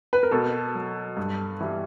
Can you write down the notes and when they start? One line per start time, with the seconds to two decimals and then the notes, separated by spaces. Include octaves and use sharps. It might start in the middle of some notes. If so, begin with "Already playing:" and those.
0.13 B4
0.23 A#4
0.31 B2 A4
0.75 F#3
1.17 G2
1.60 E3 G3